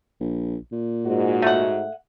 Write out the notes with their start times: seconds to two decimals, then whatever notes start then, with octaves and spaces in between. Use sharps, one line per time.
0.20 A#1
0.72 A#2
1.05 G#2 F#4
1.42 A3 F#5